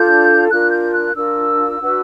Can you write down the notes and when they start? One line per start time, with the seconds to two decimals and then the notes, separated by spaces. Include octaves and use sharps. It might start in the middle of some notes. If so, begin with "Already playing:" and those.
Already playing: D4 F4 A4 G6
0.50 D4 F4 A#4 F#6
0.71 G6
0.93 F#6
1.15 D4 F4 A#4 E6
1.80 D4 F#4 B4